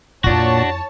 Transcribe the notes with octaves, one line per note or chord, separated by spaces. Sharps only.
F2 A#2 D4 E4 F#4 C#5 A5